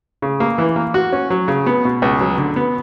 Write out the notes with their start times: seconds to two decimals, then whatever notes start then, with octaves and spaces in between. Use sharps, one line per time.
0.22 C#3
0.40 A#3
0.58 E3
0.76 A#3
0.94 F#4
1.13 C#4
1.30 F#3
1.48 C#3
1.67 B3
1.85 B2
2.02 C#2
2.20 F#3
2.38 D3
2.56 B3